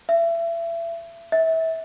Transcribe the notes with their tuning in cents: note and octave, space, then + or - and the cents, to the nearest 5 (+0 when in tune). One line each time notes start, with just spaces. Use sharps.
E5 +30
E5 -30